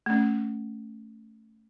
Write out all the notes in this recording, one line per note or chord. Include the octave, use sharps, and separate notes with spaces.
A3 C#4